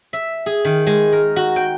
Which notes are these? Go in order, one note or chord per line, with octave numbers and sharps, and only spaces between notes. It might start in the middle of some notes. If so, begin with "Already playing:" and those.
E5
G#4
D#3
G#3
A#4
F#4
G5